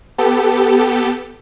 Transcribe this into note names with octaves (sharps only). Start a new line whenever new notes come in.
B3 G4 A4